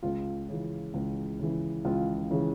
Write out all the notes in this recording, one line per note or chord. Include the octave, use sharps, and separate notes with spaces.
C#2 F4
C#3 E3
C#2
C#3 E3
C#2 F4
C#3 E3